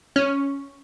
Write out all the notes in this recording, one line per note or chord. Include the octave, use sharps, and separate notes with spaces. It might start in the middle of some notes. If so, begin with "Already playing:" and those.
C#4